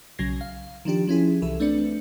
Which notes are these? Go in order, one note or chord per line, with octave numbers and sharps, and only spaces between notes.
B1 C#3 F#3 G#6 A#6 C7
F5
D#3 F3 D4 G4
F3 C#4 E4 G#4
C2 E3 A4 E5
A3 C4 D4 B4 D5 C#7